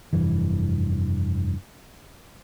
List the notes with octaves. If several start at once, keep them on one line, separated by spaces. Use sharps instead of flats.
F1 G2 E3